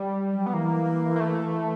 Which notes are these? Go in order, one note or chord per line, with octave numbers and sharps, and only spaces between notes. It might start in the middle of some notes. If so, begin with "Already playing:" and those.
Already playing: G3
F#3
B3
E3 A#3
A#3
A3